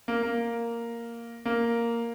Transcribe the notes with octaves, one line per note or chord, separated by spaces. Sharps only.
A#3
A#3
A#3